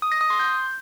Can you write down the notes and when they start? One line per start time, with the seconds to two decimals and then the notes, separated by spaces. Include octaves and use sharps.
0.02 D#6
0.12 A#6
0.21 D#6
0.30 C6
0.39 G6